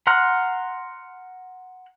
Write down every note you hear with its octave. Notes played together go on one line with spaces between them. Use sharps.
F#5 A#5 C6 F6 F#6